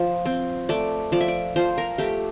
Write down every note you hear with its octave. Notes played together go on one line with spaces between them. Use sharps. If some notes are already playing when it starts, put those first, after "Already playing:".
Already playing: F3
C4
A3 D5
F3 D5
E5
D5
F3 C5
A#4
A3 G4